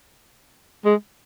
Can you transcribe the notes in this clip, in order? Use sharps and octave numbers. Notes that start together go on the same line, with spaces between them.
G#3